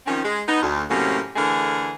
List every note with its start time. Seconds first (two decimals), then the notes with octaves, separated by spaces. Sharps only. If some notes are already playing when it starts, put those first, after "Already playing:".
0.06 D#3 F3 C4 C#4
0.24 G#3
0.48 B3 D#4
0.62 D2
0.90 A2 C3 F#3 A#3 C#4
1.36 D3 E3 A3 G#4 A#4